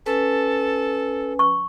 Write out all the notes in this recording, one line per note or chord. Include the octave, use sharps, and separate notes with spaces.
C#4 A4 B4 G#5
C#6